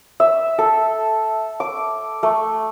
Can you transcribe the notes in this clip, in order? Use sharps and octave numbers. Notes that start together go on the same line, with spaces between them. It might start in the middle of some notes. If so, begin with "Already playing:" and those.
E5
A4
D6
A3